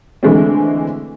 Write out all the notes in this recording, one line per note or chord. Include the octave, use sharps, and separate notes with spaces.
D3 E3 G#3 A3 C4